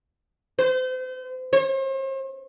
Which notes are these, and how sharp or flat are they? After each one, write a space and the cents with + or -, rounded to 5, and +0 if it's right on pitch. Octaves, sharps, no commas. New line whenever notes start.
C5 -35
C5 +45